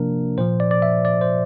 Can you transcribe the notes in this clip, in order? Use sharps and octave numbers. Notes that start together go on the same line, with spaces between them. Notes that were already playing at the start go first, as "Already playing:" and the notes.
Already playing: C3 F3 A#3 D4 A#4
A#2 F3 C5
D5
D5
E5
D5
C5